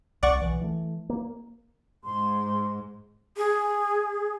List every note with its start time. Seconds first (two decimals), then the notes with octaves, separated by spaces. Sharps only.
0.23 C2 D5 F#5 C#6
0.42 B1 E3
0.61 E3 A3
1.09 A#3
2.04 G#2 C6
3.37 G#4